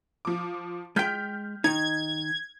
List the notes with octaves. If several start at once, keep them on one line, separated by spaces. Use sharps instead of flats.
F3 D6
G#3 G5 F6 G6 B6
D#3 D#4 G#6